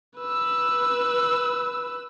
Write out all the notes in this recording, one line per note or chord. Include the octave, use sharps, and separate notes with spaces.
B4 E6